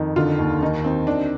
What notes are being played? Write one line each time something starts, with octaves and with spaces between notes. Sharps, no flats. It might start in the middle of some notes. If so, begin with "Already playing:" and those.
Already playing: F2 D#3
D3 F4
D#2
D#3 D#4
D#3 C4
D#3 D4